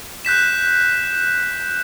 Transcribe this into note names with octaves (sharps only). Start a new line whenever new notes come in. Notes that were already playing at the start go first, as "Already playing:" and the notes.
F#6 G6 B6 E7